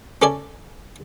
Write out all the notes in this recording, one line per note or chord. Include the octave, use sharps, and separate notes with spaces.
C#4 A4 D5 G#5